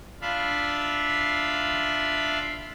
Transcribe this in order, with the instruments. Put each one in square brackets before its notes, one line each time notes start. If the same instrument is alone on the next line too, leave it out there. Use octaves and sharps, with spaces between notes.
[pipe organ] D4 F4 E5 F5 B5